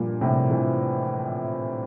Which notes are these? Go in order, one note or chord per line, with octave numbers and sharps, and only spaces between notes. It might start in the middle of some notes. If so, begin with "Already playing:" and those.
Already playing: G2 A#2
A2 C3
C3 E3